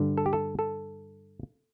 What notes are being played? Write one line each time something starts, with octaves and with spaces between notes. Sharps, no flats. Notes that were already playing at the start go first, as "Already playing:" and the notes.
Already playing: G2 D3
A4
G4
A4
A4